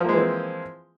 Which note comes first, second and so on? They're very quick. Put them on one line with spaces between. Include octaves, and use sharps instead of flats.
F3 A#3 G#3 E3 C4